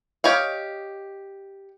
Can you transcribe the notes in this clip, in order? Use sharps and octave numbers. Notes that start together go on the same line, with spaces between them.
G4 C#5 D#5 F5